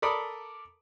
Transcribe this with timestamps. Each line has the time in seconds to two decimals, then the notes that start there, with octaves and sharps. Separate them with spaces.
0.02 A4 A#4 D5 B5 D6 D#6